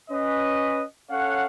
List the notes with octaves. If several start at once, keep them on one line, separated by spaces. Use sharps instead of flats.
C#4 B4 D#5
C#4 A4 C#5 F5 F#5